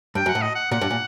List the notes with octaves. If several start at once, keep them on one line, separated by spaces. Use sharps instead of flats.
G2 G5
F#2
F#5
A2
D#5
F#5
A#2 F#5
G2
A#2